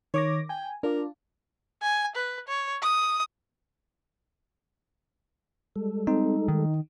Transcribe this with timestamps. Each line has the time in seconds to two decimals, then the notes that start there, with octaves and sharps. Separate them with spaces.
0.14 D#3 C#5 D6 A#6
0.49 G5 G#5
0.83 D4 F4 A#4 D5
1.82 G#5
2.16 B4
2.48 C#5
2.83 D#6
5.76 G3 G#3 A4
6.07 C4 D#4
6.48 D#3